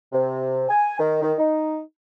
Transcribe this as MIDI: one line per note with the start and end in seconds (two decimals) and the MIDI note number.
0.13 0.64 48
0.69 0.97 80
0.98 1.19 51
1.22 1.33 51
1.38 1.78 63